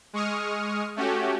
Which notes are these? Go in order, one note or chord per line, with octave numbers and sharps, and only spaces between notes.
G#3 C#6 D#6 F6
A3 C#4 F#4 G4